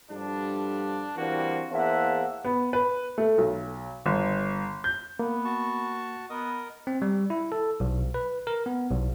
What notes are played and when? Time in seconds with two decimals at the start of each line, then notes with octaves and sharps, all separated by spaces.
0.11 G2 D3 F3 G3 D4
1.17 E3 G3 A#3 C4 D4 F#4
1.71 E2 A#3 C5 E5 F#5 A5
2.45 B3
2.73 B4
3.18 A3
3.38 B1
4.06 G1
4.84 G6
5.19 A#3 B3
5.45 F#4 A5 C#6
6.30 B3 A#4 D#5 D#6
6.87 C4
7.02 G3
7.30 E4
7.52 A4
7.80 B1
8.14 B4
8.47 A#4
8.66 B3
8.91 B1